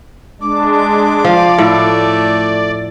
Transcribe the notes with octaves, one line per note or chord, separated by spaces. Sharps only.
G#3 D4 D6
F3 D5 F5
A2 A3